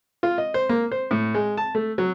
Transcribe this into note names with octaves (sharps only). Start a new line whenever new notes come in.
F4
D#5
C5
A#3
C5
A2
G#3
A5
A3
F#3